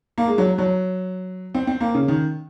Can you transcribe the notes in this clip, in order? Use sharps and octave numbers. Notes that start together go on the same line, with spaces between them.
A#3
G#3
F#3
F#3
C4
C4
A#3
C#3
D#3